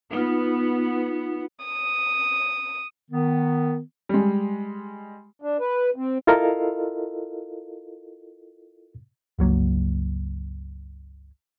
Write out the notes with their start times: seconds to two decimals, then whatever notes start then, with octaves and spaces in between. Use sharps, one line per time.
0.13 B3 D#4 F4
1.64 D#6
3.11 D#3 B3
4.09 G3 G#3
5.42 D4
5.60 B4
5.96 C4
6.27 E4 F4 A4 A#4 D#5 F5
9.39 G1 C#2 F#3 A#3